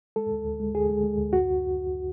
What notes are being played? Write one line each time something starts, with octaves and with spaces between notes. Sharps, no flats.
G#3 A4
D2
D2
G#3
D2 G#4
G#3
G#3
D2
F#2 F#4